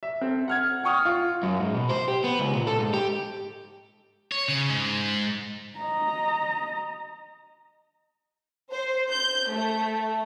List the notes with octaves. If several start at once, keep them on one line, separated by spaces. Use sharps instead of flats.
E5
C4 A4
F#5 F6 G#6
F#5 G5 C#6 D#6 F6
F4
F#2
G#2
B2
C5
G4
B3
C#2
A#2
A4
G#2
G4
C#5
C#3
G#2
D#5 A#5
C5
G6
A3